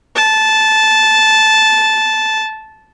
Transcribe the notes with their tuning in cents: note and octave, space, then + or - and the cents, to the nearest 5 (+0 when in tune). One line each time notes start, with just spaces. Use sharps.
A5 -10